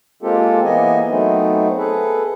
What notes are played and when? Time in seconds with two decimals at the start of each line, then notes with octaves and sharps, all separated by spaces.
0.22 G#3 A#3 C4 F4 G4 A4
0.64 E3 A#3 B3 D#5 G#5
1.09 F#3 A3 B3 C4 D#4
1.77 G#4 A4 B4